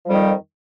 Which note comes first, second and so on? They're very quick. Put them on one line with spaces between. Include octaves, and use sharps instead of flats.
F3 G3 F2 D#3